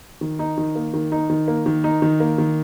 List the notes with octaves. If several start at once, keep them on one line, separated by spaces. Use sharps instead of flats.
D#3
D#4
D#3
A#3
D#3
D#4
D#3
A#3
D#3
D#4
D#3
A#3
D#3